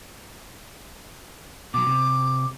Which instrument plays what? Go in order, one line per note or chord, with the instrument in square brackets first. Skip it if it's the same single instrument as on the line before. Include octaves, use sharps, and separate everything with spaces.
[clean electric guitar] B2 F#3 [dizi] D6
[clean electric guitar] C3